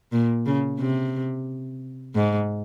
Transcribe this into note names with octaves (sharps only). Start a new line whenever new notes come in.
A#2
C#3
C3
G#2